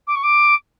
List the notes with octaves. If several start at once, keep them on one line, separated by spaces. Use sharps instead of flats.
D6
C#6
D6